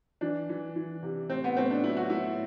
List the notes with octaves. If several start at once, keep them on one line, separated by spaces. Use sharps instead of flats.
E3 D4
E3
E3
C3
A2 C4
B3
A2 C4
D4
F#3 E4
F#4
A2 E4